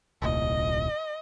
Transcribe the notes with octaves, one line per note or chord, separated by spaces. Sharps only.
D#1 C2 A#2 D#5